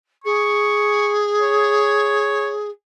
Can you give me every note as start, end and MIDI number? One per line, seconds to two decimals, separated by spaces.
0.24 2.69 68
0.24 1.12 85
1.42 2.53 73